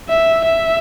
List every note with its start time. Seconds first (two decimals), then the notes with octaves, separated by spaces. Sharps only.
0.09 E5
0.45 E5